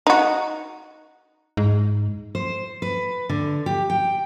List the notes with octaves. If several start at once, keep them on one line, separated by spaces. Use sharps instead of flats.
D#4 F#4
G#2
C5
B4
D3
G4
G5